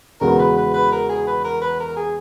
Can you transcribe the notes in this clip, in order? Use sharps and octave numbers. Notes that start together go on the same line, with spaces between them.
E2 C#3 G#3 B3 F#4 A#4
B4
B4
B4
A#4
G#4
B4
A#4
B4
A#4
G#4